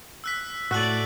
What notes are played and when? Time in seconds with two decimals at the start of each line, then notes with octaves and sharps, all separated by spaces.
0.24 E6 F#6 B6
0.71 A2 A3 F#4 D5 E6 F#6 F#7